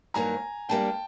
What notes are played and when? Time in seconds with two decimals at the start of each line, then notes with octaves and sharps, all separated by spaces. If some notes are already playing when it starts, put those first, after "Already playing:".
0.14 G2 D#3 F#3 A#3 G#5 A#5
0.69 G3 A#3 D4 G5 A5